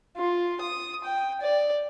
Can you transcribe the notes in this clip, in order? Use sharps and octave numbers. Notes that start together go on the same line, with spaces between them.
F4
D#6
G5
D5